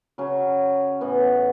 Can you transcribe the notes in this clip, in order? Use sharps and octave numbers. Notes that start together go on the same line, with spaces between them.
C#3 F#3 C#4
A2 E3 B3